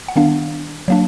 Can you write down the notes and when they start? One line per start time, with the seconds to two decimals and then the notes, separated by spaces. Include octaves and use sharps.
0.08 F#5
0.16 D#3 G3 B3 D4 F5
0.88 F#3 A#3 D4